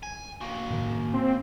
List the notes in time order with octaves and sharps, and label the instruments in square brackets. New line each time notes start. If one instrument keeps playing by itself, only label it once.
[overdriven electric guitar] G#5
A#3 F#4
[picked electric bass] A2 D#3
[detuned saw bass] C4